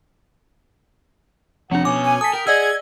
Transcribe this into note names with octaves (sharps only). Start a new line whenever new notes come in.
F2 C3 F3 D4 F#5
B2 C#4 D6
G#5
A4 D#6 B6
A#4 G5
G#4 D5 D#5 F#5 E6 G#6